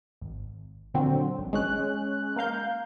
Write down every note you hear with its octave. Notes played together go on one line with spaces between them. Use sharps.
G#1
A#2 D3 F#3 C4
G#1
G#3 C#4 F#6
A#3 A#4 F5 G6